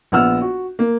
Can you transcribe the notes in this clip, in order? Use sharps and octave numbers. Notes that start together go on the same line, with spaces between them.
A#1 B3 F#5 E6 F6
F#4
A#3